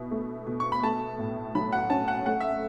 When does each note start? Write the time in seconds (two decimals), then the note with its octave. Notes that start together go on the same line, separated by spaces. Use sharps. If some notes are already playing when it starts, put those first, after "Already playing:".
Already playing: B2 E4
0.11 A3
0.47 B2
0.60 C#6
0.72 B5
0.83 A3 A5
1.19 A2
1.55 F#3 B5
1.72 F#5
1.90 C#4 A5
2.08 F#5
2.26 A3 F#5
2.40 E5